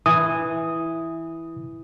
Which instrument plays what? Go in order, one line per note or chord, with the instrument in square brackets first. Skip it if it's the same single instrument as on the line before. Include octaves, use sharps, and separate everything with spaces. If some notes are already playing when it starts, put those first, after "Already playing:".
[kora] E3 [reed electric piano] D#6